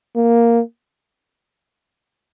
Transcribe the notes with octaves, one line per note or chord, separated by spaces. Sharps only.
A#3